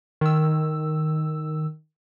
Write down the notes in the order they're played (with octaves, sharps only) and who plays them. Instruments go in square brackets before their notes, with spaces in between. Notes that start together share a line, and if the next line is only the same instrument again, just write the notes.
[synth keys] D#3 E6